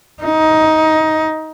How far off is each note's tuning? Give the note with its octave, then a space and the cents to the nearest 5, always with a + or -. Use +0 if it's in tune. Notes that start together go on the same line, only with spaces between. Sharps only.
D#4 +15